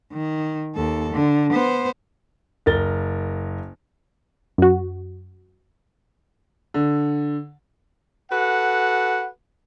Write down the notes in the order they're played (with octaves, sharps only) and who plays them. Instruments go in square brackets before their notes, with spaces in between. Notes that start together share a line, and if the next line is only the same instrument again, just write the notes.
[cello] D#3
D#2 A4
D3
B3 C5
[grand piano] F#1 A#4 A6 G7
[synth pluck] F#2 F#4
[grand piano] D3
[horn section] F#4 A4 B4 F#5